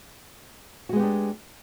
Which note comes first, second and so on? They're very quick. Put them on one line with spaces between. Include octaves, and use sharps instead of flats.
F#4 G#3 B3 G4 D4